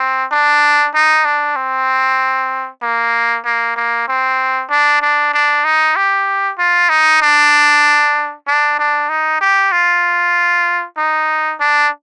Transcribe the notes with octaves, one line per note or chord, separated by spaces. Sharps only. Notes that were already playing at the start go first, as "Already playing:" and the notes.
Already playing: C4
D4
D#4
D4
C4
A#3
A#3
A#3
C4
D4
D4
D4
D#4
G4
F4
D#4
D4
D4
D4
D#4
G4
F4
D#4
D4